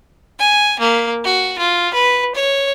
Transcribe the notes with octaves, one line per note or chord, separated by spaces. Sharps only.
G#5
A#3
F#4
F4
B4
C#5